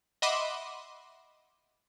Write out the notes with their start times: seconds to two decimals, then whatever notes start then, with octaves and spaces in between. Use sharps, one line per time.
0.22 D#5 E5 F#5 B5 C6 D6